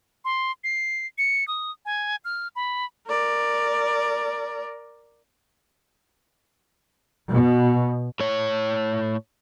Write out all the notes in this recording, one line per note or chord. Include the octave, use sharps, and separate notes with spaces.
C6
C7
C#7
D#6
G#5
F6
B5
A#4 D5
B2
A2 C#5